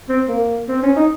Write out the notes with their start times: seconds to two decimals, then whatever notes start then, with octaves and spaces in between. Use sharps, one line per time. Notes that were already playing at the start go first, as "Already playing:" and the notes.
0.09 C4
0.29 A#3
0.69 C4
0.83 C#4
0.96 D#4